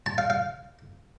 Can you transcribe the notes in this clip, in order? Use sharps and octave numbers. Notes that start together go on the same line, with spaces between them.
A5
F5
F5